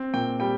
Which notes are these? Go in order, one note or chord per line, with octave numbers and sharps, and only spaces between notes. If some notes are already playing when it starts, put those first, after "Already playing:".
Already playing: C4
A#2 G5
G3 G5